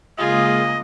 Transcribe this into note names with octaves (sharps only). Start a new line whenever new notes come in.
C#3 G#3 A#3 F4 G#4 D#5